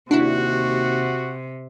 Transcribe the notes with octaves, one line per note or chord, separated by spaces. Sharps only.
D#2 C3 D4 E4 F#4